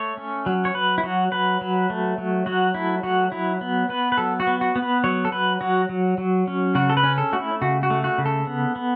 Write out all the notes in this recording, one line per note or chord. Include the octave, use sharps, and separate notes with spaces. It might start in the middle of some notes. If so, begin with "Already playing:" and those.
Already playing: A3 C#5
C#4
F#3
C#5
F#3 B4
E4
F#3 F#4
F#3 B4
F#3
A3
F#3
F#3 F#4
A3 E4
F#3 F#4
F#3 E4
B3
B3 B4
B4
F#3 A4
F#4
B3
F#4
B3
B4
F#3 C#5
A4
F#3 B4
F#3 F#4
F#3
F#3
C#4
C#3 F#4
A4
B4
C#4
A4
A3 F#4
E4
C#3 F#4
F#4
A3
F#4
C#3
A4
B3
B3